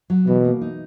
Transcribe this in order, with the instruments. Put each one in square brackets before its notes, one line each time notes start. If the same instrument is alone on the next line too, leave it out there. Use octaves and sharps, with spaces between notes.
[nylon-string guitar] F#3
[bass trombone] B2 [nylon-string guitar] E3
[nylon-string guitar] A#3
D#4